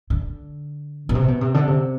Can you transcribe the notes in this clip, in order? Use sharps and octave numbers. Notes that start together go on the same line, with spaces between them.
D3
B2
C3
B2
C3
D3
C3